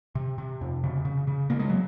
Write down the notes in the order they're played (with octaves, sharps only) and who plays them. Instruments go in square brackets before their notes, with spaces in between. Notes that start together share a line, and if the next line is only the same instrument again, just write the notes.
[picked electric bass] C3
C3
F2
C#3
C#3
C#3
C#3 A#3
G#3
F#3